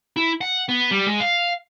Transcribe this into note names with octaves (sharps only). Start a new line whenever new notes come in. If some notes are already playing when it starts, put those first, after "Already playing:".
E4
F#5
B3
G3
G#3
F5